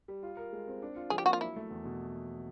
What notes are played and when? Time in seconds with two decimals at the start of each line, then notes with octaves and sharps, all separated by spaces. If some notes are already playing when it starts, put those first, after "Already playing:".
0.08 G3
0.23 F4
0.37 A#4
0.53 G#3
0.68 C4
0.82 D4
0.96 F4
1.10 F3 G#4
1.18 G4
1.26 A#3 F#4
1.33 F4
1.41 F#3 E4
1.56 A3
1.70 E2
1.85 B2